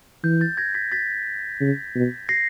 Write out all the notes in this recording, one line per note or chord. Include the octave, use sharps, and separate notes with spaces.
E3 G6
G6 A6
G#6 A#6
A6 B6
A6 B6
C#3
B2
A#6 C7